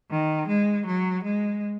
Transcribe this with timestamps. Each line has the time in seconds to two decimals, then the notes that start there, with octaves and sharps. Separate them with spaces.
0.10 D#3
0.48 G#3
0.86 F#3
1.24 G#3